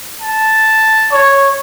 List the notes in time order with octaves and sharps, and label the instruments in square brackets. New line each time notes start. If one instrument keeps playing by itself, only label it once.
[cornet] A5
[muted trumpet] C#5